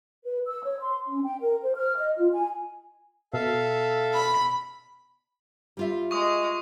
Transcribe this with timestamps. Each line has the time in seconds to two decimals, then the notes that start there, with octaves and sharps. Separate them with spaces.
0.24 B4
0.47 E6
0.64 C#5
0.80 C6
1.07 C#4
1.24 G5
1.41 A#4
1.62 C5
1.75 F6
1.97 D#5
2.18 F4
2.32 G#5
3.33 B2 A4 E5 F5
4.13 B5
5.77 G3 F4 E5
6.11 G#3 C#6 D#6